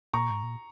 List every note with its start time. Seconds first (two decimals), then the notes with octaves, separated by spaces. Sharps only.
0.13 A#2 A#5 C#6
0.30 G#2
0.43 A#2